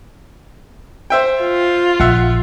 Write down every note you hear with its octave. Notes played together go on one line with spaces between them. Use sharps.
C5 E5 G5
F4
A#1 E5 F#5